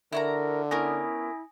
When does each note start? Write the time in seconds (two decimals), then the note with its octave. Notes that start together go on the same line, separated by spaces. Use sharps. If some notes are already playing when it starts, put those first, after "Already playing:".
0.13 D3 E4 F#4 A#4 A#5
0.71 B3 C#4 E4 A#4 G#5 D#6 A#6